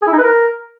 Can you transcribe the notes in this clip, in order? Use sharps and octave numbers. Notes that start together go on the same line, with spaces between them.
G#4
E4
D#4
B4
A#4